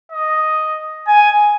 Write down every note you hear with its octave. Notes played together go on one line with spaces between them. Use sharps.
D#5
G#5